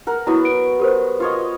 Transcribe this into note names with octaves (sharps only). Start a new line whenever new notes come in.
A#4 F#5
F#3 B3 E4 F#4
D7
G4 A#4 C5
F4 C#5 D#5